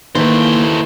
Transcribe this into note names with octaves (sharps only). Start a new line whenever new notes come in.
D#3 E3 A3 A#3 B4 C5